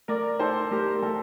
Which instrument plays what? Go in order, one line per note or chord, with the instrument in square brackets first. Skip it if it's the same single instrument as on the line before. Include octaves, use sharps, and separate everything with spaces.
[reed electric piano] A3 [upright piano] A#4 D5
[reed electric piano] D#4 [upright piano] A4 C5
[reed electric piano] A3 [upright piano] G4 A#4
[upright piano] A#4
[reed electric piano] A3 [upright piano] A4